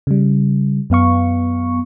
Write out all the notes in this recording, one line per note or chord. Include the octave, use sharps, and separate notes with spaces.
C#3 G3
F#2 B3 F5 C#6